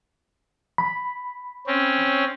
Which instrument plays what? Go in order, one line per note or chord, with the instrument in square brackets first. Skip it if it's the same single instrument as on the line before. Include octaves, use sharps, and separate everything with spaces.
[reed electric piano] B5
[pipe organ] C4 C#4